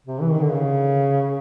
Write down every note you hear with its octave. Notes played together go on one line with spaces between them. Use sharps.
C3
E3
D#3
D3
C#3